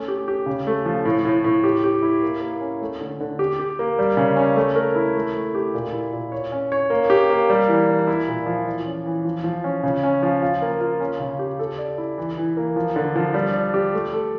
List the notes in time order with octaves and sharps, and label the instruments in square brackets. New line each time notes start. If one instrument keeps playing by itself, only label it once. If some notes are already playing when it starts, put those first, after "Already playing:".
Already playing: [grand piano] A3 C#4
G4
G4
C#3
A3
F3
A2
A2
A2
G4
G4
E4
A#3
A#3
C#4
A3
D3
D3
G4
G4
A#3
G3
C#3
C#4
A3
A#4
E4
A3
A3
G4
A#2
E4
A#2
C#5
C#4
C#5
A#3
G4
A#3
G3
E3
D4
E4
A#2
F3
E3
C#4
E3
F3
F3
C#4
C#3
C#4
F3
F4
A#3
F4
C#4
C#3
G4
A4
D5
E4
E3
E3
A#3
F3
D3
F3
G3
D4
G4
A3
A4